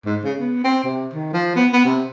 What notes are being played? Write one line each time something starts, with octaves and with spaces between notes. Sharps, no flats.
G#2
C#3
B3
C4
C3
D#3
F3
B3
B3
C3